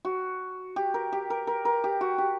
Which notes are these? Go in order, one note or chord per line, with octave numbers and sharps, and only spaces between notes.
F#4
G4
A#4
G4
A#4
A#4
A#4
G4
F#4
G4